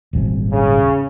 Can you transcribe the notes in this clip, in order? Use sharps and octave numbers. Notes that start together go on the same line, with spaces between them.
D#1 G#1
C#3